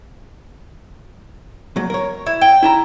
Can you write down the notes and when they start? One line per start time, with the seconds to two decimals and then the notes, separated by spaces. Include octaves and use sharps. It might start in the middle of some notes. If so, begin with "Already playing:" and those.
1.76 A#2 F#3
1.90 A#4 C#5
2.27 E4
2.41 G5
2.63 E4 A5 A#5